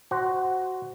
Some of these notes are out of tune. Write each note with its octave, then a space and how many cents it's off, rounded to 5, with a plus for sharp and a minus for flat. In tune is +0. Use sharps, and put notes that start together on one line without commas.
F#4 +10 C5 +0